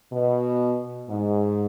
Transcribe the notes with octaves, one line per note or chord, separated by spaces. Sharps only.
B2
G#2